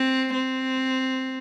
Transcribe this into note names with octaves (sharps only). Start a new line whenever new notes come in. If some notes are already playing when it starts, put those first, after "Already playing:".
Already playing: C4
C4